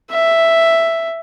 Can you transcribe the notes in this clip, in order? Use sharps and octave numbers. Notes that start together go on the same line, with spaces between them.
E5